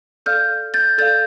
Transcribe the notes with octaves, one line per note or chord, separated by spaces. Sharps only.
A4 D5 F5 F6 G6
G6 A6
A4 D5 F5 G6 A6